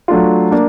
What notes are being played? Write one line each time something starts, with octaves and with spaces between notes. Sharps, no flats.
F#3 A3 D4 F4
A#3 D4